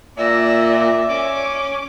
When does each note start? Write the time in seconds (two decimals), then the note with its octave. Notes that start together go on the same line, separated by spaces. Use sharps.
0.18 A#2 D5 E5 E6 A#6
1.09 C#4 D6